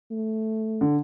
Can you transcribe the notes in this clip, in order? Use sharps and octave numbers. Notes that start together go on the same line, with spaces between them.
A3
D3